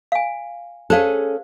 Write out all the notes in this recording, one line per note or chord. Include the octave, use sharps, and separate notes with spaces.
F5 G#5
C#4 G#4 A4 C5 F5